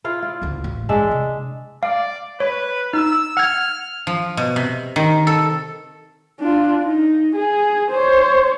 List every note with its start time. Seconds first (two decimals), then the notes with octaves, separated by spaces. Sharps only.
0.04 E4 F4 F5
0.22 F4 D5
0.42 F#1 D2
0.64 A1
0.89 G2 E3 G#3 D4 E5
1.11 C3
1.83 D5 F5
2.40 B4 C#5
2.93 D#4 E6
3.37 F#5 F6 G#6
4.07 F3
4.37 B2
4.56 C3
4.96 D#3
5.27 A4
6.40 D4 F4
6.82 D#4
7.36 G#4
7.91 C5 C#5